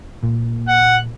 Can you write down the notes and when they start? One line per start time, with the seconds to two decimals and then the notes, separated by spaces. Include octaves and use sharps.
0.23 A#2
0.68 F#5